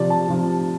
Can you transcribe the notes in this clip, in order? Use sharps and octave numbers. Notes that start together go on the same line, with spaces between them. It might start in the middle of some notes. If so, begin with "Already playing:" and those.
Already playing: C3 F3 D5
A5
C3 F3